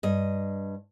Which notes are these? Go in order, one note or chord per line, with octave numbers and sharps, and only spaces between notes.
G2 D#5